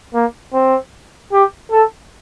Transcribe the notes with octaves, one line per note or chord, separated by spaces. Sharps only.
A#3
C4
G4
A4